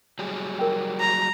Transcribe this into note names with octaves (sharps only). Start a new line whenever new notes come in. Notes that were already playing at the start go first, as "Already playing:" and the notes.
F#3 G3 G#4
A#4 G5
A#5